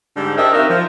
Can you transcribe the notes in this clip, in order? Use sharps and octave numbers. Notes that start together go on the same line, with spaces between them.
G#2 D3 G3 D4
D4 G4 A#4 C5 D#5 E5
C3 D#4 F#4 A#4 E5 F5
F3